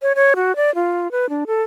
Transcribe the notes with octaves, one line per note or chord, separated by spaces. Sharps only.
C#5
C#5
F#4
D5
F4
B4
D4
A4